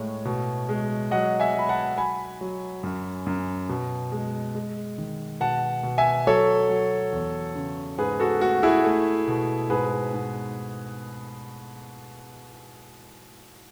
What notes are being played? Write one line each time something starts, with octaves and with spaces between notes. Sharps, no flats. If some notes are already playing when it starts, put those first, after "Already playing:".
Already playing: A2 G#3 C#5
B2
G#3
F#3 D#5 F#5
E5 G#5
F#3 B5
F#5 A5
F#3 G#5 B5
F#3
F#2
F#2
B2
G#3
G#3
D#3
B2 F#5 A5
B2
E5 G#5
F#3 A4 C#5
F#3
E2
C#3
G#2 G#4 B4
F#4 A4
A3 F#4
E4 G#4
A3
B2
G#2 G#4 B4
G#2